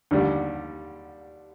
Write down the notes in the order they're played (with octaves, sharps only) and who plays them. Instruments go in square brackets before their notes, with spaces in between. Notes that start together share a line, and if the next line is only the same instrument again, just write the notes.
[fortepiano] D#2 D3 G3